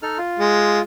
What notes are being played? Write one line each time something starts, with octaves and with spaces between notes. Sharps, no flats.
D#4 A4 F6
F4
G#3